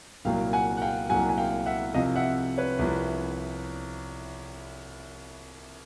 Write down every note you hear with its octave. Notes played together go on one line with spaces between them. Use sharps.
C2 A#2 F#3 F5 G5
F#5 G#5
F#5
F5 G5
C2 A#2 F#3 F#5 G#5
G#5
F5 G5
E5 F#5
C2 C3 F3 D#5 F5
E5 F#5
B4 C#5
C2 C3 F3